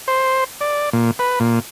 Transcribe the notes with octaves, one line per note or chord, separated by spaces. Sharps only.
C5
D5
A#2
B4
A#2